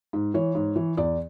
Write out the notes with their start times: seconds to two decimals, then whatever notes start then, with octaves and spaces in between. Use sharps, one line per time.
0.13 G#2
0.34 E3 C#5
0.55 G#2
0.76 E3
0.97 E2 D5